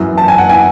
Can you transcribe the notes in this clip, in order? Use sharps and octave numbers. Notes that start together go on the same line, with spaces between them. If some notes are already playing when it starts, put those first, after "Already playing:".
Already playing: F#2 E3
A5
G#5
F#5
E3 G#5